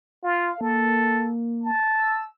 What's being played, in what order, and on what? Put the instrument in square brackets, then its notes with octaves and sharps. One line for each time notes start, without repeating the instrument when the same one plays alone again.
[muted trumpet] F4 [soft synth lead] F5
[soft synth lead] A#3 [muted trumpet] A4
[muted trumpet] A5
[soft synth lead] E6